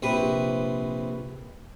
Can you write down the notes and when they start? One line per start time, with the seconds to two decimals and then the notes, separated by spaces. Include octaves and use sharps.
0.03 A#1 C3 B4